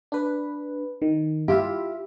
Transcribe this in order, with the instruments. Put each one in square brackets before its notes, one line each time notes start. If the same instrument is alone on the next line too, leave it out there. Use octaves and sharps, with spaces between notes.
[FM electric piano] D4 B4
D#3
[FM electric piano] E4 F4 E5 [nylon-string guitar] G4